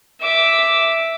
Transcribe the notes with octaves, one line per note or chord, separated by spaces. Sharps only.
E5 D6